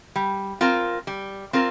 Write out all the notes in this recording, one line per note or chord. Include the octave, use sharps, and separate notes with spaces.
G3
C4 F4 A#4
G3
C4 F4 A#4